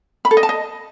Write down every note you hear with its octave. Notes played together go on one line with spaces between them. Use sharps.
B5
A4
D#5
A5
D#5